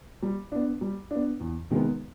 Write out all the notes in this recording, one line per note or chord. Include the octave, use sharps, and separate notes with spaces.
G3
B3 D4
G3
B3 D4
E2
C3 D#3 G#3 B3